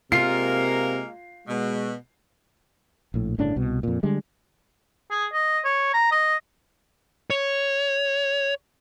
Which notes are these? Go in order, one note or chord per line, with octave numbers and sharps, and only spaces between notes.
C3 G#3 A#3 F4 A#4 C7
B2 G#3
A#1 A2
G1 A2 C#3 D4
C2 B2
F2 A#2
D3 G3 G#3
G#4
D#5
C#5
A#5
D#5
C#5